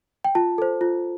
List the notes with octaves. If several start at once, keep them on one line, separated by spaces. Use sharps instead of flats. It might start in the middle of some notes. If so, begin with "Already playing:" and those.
G5
F4 A5
A4 C5
F4